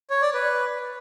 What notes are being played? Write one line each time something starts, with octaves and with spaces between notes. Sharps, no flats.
C#5
D5
B4